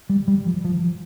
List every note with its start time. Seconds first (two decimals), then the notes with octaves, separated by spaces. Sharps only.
0.09 G3
0.28 G3
0.46 F3
0.64 F3